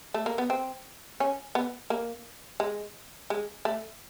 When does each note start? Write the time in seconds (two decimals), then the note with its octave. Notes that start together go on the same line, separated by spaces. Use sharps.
0.14 A3
0.26 A#3
0.38 B3
0.50 C4
1.20 C#4
1.55 B3
1.90 A#3
2.60 G#3
3.30 G#3
3.65 A3